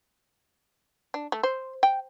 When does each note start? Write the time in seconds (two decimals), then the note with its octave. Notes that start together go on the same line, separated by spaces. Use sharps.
1.14 D4
1.32 A3
1.43 C5
1.83 G5